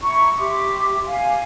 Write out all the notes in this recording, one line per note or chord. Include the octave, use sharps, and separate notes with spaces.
E4 A#5 C#6
G4 E5 C6 D6
F5 G#5